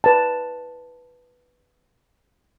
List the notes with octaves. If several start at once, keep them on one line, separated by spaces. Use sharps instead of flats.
B4 A5